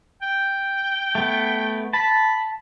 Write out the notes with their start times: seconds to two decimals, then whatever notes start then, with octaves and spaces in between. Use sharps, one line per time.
0.22 G5
1.15 A3 B3
1.93 A5 B5